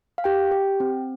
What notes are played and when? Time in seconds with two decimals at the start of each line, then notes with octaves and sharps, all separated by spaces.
0.18 F5
0.24 G4 G5
0.52 G4
0.80 C4